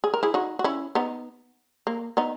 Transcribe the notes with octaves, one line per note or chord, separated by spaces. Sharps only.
G#4
A#4
E4 G#4
D#4 F#4
F#4
C#4 E4
B3 D#4
A#3
B3 D#4